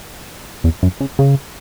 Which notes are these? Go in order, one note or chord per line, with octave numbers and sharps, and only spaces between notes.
E2
F#2
C#3
C#3